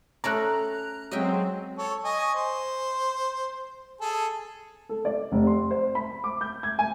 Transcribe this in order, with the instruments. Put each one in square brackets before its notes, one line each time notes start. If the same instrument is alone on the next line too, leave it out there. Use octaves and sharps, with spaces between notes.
[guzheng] A3 C#4 D5 [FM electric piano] A#5 F#6
[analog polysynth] F#3 G#3 C4 [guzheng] D#5 E5 G5
[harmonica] A4 C#5
D#5 G#5 C#6
C5
G#4 A4 G#5
[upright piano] A4
D5
F1
C6
C5
B5
D6
G6
G#6
G#5